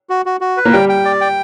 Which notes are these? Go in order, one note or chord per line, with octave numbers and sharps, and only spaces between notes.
F#4
F#4
F#4
B4
A#3
G3 G5
G5
D5
G5